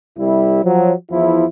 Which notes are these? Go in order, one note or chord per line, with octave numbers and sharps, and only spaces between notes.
C2 G3 E4
F3 F#3
E2 F3 E4